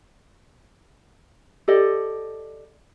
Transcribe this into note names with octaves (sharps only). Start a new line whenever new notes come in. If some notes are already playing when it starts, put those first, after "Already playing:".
G4 A4 D5 D#5